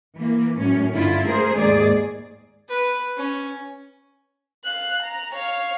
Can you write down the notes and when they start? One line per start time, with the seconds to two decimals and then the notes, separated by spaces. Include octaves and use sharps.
0.16 E3 A#3
0.59 F#2 A2 C#4
0.95 G2 D3 E4 F4
1.24 A3 G#4 A#4 C5
1.56 D#2 G#2 G#4 D5
2.68 B4
3.17 C#4
4.65 F5 F#6
5.03 A#5
5.35 C#5 F5